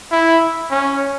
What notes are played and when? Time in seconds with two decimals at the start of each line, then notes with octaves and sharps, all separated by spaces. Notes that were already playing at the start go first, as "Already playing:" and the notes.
0.12 E4
0.71 C#4